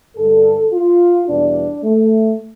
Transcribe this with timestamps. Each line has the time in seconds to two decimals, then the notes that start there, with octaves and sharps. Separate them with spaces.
0.16 G2 D3 G3 A4
0.73 F4
1.27 E2 B2 G3 D4
1.84 A3